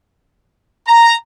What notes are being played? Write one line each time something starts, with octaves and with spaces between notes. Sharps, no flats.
A#5